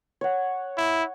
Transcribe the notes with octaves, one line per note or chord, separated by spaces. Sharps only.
C#5 F#5
E4